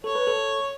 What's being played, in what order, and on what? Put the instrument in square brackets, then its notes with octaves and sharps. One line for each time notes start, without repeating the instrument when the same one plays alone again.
[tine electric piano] A4 [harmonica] C#5
[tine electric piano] B4
A4